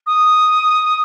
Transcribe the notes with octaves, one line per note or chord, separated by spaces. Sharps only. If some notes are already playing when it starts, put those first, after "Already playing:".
D#6